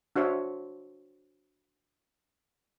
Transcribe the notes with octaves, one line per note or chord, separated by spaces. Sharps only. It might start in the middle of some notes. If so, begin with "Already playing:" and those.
D4 F#4 C5 C#5 E5